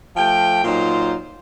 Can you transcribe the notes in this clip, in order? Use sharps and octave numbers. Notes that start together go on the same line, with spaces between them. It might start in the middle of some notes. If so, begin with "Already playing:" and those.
F3 A3 G5
A#2 F#3 D#4 F4 C5